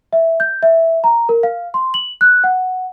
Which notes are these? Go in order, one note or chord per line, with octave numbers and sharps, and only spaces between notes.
E5
G6
E5
A#5
A#4
F5
C6
F#7
F#6
F#5